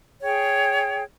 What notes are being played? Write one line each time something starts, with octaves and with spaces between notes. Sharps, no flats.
G#4 C#5 G5